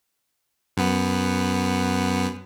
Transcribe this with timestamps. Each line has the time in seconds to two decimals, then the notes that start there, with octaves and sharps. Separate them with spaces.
0.77 F#2 B3